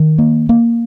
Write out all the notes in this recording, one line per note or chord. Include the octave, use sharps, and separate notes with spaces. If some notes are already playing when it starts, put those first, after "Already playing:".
Already playing: D#3
A#3
A#3